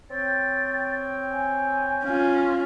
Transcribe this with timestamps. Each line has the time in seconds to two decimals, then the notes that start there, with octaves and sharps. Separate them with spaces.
0.11 C4 C#5 G5 A6
1.30 G#5
2.04 C#4 F4